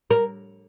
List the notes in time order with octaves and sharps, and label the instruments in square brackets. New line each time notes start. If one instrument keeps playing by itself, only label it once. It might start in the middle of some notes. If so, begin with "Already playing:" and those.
[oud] A#4